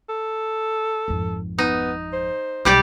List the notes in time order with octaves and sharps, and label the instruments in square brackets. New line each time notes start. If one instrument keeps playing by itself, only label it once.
[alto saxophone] A4
[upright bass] G#1 F2
[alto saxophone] B3 [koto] D#4
[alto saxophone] C5
[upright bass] B1 G#3 [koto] G3 G4 D5